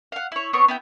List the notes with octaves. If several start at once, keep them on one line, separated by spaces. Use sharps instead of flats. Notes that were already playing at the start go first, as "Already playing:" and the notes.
F5 F#5
E4 C#5
B3 C4 C#5 C#6
B3 E4 G5